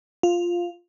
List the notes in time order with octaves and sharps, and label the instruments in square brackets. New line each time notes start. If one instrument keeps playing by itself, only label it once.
[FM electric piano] F4